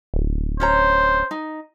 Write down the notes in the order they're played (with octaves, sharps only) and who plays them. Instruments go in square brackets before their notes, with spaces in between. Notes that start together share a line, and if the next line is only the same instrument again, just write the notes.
[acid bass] D1
[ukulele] C#4 C#5 A#5 [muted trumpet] C5
[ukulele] D#4